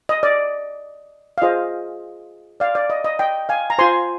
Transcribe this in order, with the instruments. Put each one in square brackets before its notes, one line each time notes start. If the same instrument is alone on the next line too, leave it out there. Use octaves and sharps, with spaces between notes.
[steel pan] D#5
D5
F5
F4 G#4 C5 D#5
D5 F5
D5
D#5
D#5
D#5 G5
F5 G#5
A#5
F4 C5 G#5 C6